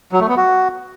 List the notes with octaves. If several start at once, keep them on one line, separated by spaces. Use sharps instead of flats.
F#3
A3
B3
F#4